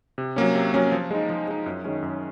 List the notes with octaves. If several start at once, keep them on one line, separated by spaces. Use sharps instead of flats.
C3
F#3 A#3 C#4
C3
F#3 A#3 C#4
F3
G#3 D#4
F3
G#3 D#4
F#2
D#3 G#3 C#4
F#2